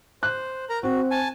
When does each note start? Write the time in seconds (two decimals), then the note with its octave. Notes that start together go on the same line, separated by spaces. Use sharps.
0.23 C5 F#6
0.69 A#4 A#5
0.83 C4 F#4
1.11 G#5 A5